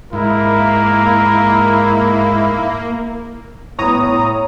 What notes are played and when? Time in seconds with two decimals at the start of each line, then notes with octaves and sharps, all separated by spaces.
0.13 G#2 A#3 E4 A#4
3.79 A2 B3 C#5 A#5 D#6
4.03 A2